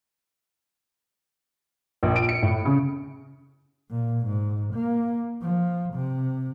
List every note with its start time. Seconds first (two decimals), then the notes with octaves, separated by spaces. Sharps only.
2.03 A#1
2.16 D7
2.29 C#7
2.42 A2
2.65 C#3
3.91 A#2
4.26 G#2
4.74 A#3
5.42 F3
5.94 C3